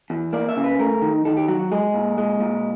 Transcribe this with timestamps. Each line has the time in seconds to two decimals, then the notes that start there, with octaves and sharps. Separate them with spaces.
0.10 E2
0.33 A#3 D5
0.49 E5
0.57 C#3
0.64 B4
0.79 A3 A#4
1.02 D#3
1.25 D#3 A4
1.37 G4
1.48 F#3 F#4
1.60 F#4
1.72 G#3 G#4
1.94 A#2
2.18 G#3
2.40 A#2